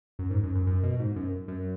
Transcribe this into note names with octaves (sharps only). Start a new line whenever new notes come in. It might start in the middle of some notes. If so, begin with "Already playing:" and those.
F#2
G#2
F#2
F#2
F#2
B2
G#2
F#2
F#2